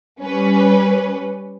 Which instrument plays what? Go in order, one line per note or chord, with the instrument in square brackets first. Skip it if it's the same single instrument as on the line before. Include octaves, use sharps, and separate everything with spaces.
[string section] G3 C#4 B4